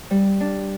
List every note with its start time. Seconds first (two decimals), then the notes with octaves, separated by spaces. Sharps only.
0.10 G3
0.40 D4